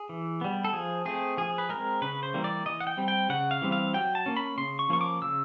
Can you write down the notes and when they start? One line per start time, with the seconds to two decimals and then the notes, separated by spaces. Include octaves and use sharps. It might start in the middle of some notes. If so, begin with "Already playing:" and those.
Already playing: G#4
0.09 E3
0.41 G3 B3
0.64 A4
0.73 F3 G#4
1.05 A3 C4 G#4
1.37 F3 G#4
1.58 B4
1.69 G#3 C4 A#4
2.02 C#3 B4
2.23 C5
2.34 E3 G3 A#3
2.44 D5
2.66 E3 D#5
2.80 F#5
2.87 G5
2.97 G3 C4
3.08 G5
3.29 C#3 F#5
3.51 F5
3.62 E3 G3 C4
3.72 F5
3.94 F#3 G5
4.15 A5
4.26 A#3 C#4
4.37 B5
4.58 C#3 C6
4.79 C#6
4.89 F3 A#3 C#4 C#6
5.01 D6
5.22 C#3 E6